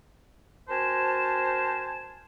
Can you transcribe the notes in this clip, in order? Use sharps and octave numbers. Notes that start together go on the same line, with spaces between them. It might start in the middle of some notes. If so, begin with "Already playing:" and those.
C4 F#4 A#4 C5 G#5 A5